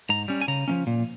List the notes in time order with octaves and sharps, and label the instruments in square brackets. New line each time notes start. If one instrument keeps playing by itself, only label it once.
[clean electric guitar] G#2 A#5
G3 C#4
G#5
C#3 A#5
F3 A#3 C#4
A#2